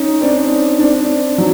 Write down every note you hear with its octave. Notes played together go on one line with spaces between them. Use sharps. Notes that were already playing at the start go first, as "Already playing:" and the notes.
Already playing: C#4 D#4
C4 D4
C4 D4
F#3